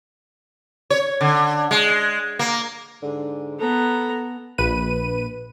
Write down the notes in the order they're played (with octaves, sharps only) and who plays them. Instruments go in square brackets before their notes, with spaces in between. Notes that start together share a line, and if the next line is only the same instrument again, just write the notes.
[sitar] C#5
D3
G#3
A#3
[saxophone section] G#2 D3
[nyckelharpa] B3 A#5 [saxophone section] A4
[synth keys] A#1 B4 D#7